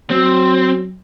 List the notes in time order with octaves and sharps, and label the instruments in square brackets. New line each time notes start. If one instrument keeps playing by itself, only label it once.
[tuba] F#3 [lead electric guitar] C4